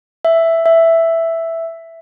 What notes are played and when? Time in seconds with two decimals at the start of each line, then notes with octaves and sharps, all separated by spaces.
0.25 E5
0.66 E5